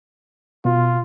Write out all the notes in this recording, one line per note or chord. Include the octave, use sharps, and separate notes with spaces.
B2 F4